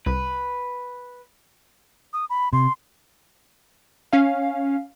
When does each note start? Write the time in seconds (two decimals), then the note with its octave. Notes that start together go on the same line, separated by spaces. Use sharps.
0.06 C2 B4
2.13 D#6
2.30 B5
2.53 C3 C6
4.13 C#4 F5